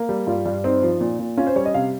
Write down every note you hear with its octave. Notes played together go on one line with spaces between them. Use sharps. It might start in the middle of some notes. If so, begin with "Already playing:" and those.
Already playing: A#3
G3
G2 F4
G2
C4 D#4
F3
A#2
A#2
C#4 F4
C5
G3 C#5
D#5
C3 F5